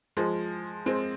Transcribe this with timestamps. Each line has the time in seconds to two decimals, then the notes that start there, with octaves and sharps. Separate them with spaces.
0.17 F3 G#3
0.86 G#3 C4